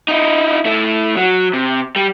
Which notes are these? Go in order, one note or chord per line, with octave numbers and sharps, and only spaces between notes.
D#4 E4
A3 E4
F#3
C3
G3